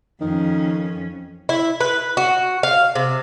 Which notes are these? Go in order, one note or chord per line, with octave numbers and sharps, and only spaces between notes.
F2 D#3 C#4
E4
B4
F#4
F5
C3